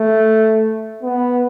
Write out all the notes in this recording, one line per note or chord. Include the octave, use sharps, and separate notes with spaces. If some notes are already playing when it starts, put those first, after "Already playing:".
Already playing: A3
B3